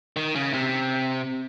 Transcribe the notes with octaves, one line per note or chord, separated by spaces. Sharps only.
D#3
C#3
C3